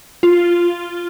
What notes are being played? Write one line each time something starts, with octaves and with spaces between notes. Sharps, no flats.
F4